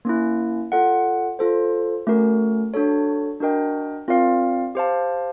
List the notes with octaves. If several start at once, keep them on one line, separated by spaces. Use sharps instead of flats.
A#3 C#4 E4
F4 A4 D5 F#5
F4 A4 C5
A3 C#4 F#4 A#4
D4 F#4 A4 C#5
D4 F#4 A#4 D#5 G5
C4 F4 A#4 D5 F5
G4 C5 F5 A5